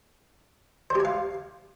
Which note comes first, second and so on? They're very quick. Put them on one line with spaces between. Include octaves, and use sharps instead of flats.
C5 G4 G#5 F5